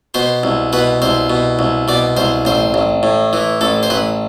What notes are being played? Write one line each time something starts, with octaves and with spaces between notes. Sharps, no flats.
B2 C5
C2
B2 B4
C2 C5
B2
C2
B2 D5
C2 C5
A1 C5
A1
A2
E3
A1 A4
C5
A1 B4